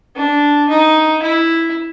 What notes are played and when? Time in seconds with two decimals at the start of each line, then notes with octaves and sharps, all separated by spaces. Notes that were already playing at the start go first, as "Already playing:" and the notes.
0.15 D4
0.69 D#4
1.23 E4